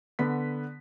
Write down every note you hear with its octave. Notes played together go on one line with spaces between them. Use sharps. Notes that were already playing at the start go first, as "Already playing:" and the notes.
D3 B3 B6